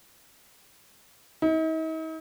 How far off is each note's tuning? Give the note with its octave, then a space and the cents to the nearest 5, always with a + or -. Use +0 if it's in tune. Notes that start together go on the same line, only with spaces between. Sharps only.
D#4 +45